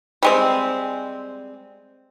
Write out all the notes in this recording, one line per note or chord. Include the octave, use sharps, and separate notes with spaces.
G3 G#3 C4